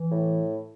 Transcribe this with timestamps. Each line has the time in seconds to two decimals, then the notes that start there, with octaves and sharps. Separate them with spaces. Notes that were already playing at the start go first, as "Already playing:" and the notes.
Already playing: E3
0.12 A2